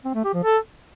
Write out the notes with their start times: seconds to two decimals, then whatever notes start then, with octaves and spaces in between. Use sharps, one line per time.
0.05 C4
0.15 A3
0.24 G4
0.34 F3
0.44 A4